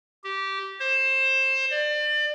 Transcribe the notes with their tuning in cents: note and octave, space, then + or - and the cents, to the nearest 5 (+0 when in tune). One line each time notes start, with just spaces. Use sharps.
G4 -15
C5 +25
D5 +30